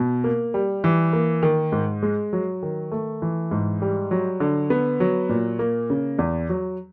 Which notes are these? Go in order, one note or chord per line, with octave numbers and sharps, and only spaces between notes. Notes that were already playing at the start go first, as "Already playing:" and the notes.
Already playing: B2
A#3
G3
E3
A#3
D#3
G#2
G#3
F#3
D#3
A3
E3
G#2
G3
F#3
D3
B3
F#3
A#2
A#3
C#3
E2
F#3